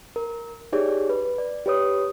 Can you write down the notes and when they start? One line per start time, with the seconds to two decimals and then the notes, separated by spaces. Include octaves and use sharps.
0.16 A#4
0.72 D#4 G4 G#4 C#5 D5
1.09 B4
1.38 D5
1.66 G4 B4 C#5 D#6